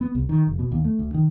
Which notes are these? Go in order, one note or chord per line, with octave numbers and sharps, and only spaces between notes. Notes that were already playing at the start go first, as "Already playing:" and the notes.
B3
C2
D#3
F1
B2
D#2
A3
D2
D#3